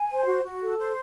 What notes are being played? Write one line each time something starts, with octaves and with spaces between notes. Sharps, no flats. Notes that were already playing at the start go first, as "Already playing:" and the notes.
Already playing: G#5
C5
F#4
F#4
A4
C5